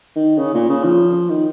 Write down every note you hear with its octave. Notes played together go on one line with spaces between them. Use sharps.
D#3
C#3
A#2
C#3
F3
D#3